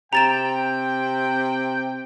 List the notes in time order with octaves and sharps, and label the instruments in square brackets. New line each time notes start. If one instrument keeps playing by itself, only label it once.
[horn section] C3 G5 [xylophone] A#5 A6 E7